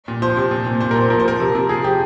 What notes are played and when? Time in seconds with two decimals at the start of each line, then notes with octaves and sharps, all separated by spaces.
0.08 A#2
0.22 F3 C5
0.37 C3
0.51 A#2
0.66 A#2
0.80 A#2 C5
0.91 A#2 A#4
1.01 C5
1.10 F3 A#4
1.20 C5
1.25 F3 A#4
1.40 C3
1.55 C3
1.69 F3 G#4
1.84 F3 G4